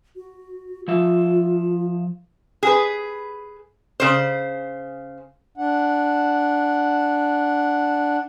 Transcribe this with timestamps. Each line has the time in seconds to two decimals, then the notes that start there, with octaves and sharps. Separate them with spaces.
0.16 F#4
0.88 F3 F4 E5
2.63 G#4 B4
4.00 C#3 C5
5.58 D4 F#5